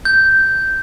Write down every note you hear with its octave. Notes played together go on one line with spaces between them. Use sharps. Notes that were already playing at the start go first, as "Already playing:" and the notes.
G6